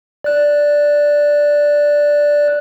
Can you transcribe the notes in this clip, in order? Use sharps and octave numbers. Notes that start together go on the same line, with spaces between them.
D5 F#6